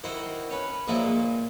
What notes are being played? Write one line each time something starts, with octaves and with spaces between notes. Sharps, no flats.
D#3 E4 F#4 C5
C#4 B4
A#2 F3 G#3 A#3 D4 E4
A#2